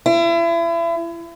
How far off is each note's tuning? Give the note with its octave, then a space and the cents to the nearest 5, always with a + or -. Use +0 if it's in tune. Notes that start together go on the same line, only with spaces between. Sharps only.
E4 +35